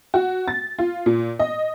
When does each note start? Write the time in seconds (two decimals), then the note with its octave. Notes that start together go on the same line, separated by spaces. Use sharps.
0.14 F#4
0.48 A6
0.79 F4
1.06 A#2
1.39 D#5